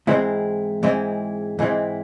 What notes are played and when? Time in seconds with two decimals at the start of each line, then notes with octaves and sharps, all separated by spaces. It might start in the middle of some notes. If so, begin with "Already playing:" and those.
0.07 G#2 E3 G#3 C4 E4
0.83 G#2 E3 G#3 C4 E4
1.59 G#2 E3 G#3 C4 E4